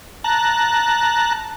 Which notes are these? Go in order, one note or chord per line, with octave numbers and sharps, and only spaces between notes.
A5 A#5 F#6